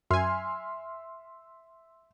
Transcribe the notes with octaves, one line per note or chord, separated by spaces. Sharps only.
F#2 E5 G#5 C6 F6